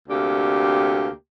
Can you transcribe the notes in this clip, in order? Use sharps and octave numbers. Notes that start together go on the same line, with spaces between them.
D2 C3 A#3 G4 D5